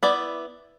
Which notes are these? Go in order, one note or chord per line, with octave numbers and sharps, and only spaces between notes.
B3 E4 D5